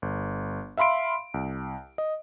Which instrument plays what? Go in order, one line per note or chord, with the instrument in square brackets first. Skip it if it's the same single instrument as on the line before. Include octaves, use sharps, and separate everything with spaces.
[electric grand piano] G1
E5 F5 B5 C6 D7
C2
D#5